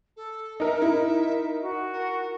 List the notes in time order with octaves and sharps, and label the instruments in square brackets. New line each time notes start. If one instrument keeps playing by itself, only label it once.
[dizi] A4
[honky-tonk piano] D#4 A#4 [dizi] E5
[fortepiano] E4
[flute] F#4
[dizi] A#4